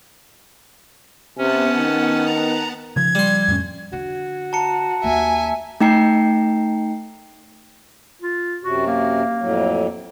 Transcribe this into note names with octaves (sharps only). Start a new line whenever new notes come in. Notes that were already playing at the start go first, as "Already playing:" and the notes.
C3 B3 C#4 F#5 A5
D#3
A#5
C#3 F3 G#6
G3 C6
F2 A2 C#4
D3 F#4
A5 A#5 C#7
D#2 A#3 E5 G#5
A3 D#4 G5 A#5 C7
F4
F#2 C3 F#4
A#3
F2 A2 F#3